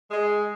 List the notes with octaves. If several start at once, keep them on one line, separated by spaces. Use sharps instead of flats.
G#3